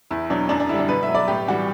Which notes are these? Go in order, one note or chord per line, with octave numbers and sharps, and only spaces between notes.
E2 E4
B2 F#3 D4
F#2 D4
D4
D3 G3 E4
D4
B2 B4
E5
F#3
D5
A2 G4
E3 G3 F#4